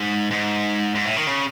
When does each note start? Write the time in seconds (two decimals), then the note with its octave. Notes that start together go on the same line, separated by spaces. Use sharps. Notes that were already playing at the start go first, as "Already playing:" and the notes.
Already playing: G#2
0.31 G#2
0.95 G#2
1.06 A2
1.17 D#3
1.27 C#3